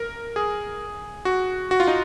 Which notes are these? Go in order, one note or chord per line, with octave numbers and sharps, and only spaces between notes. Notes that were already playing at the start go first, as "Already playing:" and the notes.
Already playing: A#4
G#4
F#4
F#4
F4
D#4